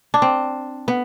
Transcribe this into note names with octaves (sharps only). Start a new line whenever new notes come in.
D4
C4
B3